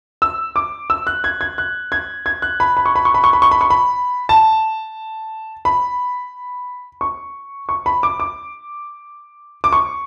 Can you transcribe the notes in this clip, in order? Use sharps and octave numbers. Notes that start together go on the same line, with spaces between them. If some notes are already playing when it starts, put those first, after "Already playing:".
E6
D6
E6
F#6
G#6
G#6
F#6
G#6
G#6
F#6
B5
B5
C#6
B5
C#6
B5
C#6
B5
C#6
B5
C#6
B5
A5
B5
C#6
C#6
B5
D6
D6
D6
C#6